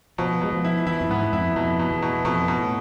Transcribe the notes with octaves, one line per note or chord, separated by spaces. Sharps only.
B2 F3
B2 G#3
F3
E4
E3 E4
F2
G#2 B3
F2 E4
F2 B2
B2
E2
B2
F2 B2
B2
A2